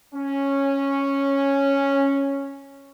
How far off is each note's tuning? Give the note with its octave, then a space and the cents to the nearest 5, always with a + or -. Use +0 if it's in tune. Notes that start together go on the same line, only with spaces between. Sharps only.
C#4 -5